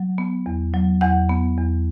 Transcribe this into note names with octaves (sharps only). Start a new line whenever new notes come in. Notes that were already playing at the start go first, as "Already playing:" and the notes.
Already playing: F#3
B3
E2
F#3
E2 F#5
B3
E2